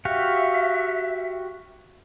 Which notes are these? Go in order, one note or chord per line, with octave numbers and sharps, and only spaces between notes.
F#4 G4 E5 F5